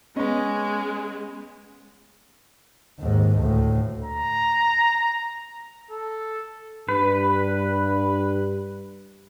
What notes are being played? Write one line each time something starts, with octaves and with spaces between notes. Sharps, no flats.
G#3 B3 C#4 D#5
D#2 G#2
D2 A2
A#5
A4
G2 B4